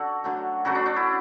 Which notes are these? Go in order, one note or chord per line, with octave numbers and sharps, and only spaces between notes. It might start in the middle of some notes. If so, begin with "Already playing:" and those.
Already playing: D3 F#4 A4
D3 F#3 A3
C#3 F#3 A3 F#4
D4
D4
E4